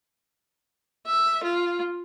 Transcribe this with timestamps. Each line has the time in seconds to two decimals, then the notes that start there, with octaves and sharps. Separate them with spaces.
1.07 E5
1.43 F4